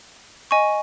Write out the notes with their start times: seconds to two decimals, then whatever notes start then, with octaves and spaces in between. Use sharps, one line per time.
0.51 D#5 G#5 C#6